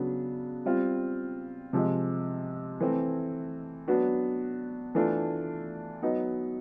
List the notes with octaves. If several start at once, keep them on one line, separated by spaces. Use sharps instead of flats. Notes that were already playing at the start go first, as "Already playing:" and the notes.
Already playing: C#3 F#3 B3 D4
G3 C4 F4
C3 F3 G#3
E3 A3 C4
F#3 B3 D4 F#4
E3 A3 D4 F4
F#3 B3 D#4 F#4